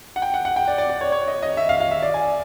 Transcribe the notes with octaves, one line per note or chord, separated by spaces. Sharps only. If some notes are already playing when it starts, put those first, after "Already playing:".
F#5
G5
F#5
F#5
G5
D5
D5
D5
C#5
C#5
D#5
D#5
E5
F5
F5
E5
D5
G#5